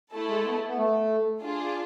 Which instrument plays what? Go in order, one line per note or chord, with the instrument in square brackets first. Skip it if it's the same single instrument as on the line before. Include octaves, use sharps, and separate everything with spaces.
[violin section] A3 E4 A4
[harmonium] G#3
B3
B3
A3
[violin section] D4 F4 G#4